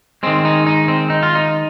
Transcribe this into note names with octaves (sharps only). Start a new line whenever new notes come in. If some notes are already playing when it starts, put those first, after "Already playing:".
D#3 G#3 C4
D#4
D#4
C4
D#4
F4
D#4